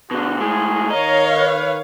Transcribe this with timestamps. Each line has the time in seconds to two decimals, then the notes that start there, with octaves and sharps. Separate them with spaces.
0.11 B2 D3 F#4
0.40 A2 G#3 G#4
0.90 D#3 C#5 D#5 F5 A#5
1.35 B4